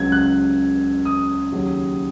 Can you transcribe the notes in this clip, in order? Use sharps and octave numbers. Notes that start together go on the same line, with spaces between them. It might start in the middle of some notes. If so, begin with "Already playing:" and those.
Already playing: C#2 C#3 F#3 G#6
F#6
D#6
D#2 C#3 F#3